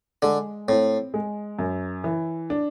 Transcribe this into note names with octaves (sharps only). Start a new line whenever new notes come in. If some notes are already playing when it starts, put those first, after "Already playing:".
D3 G#3
A2 C4
G#3
F#2
E3
D4